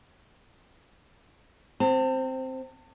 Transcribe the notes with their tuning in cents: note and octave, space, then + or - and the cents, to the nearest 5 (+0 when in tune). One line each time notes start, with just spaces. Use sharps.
C4 +0 A5 +40